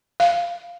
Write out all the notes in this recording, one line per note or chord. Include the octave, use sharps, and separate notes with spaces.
F5